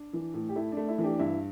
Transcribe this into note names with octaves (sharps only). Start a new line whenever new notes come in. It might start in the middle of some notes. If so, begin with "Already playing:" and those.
Already playing: D4
E3
A2
G4
A3 E4
D4
A3
E4
E3
D4 G4
G2 E4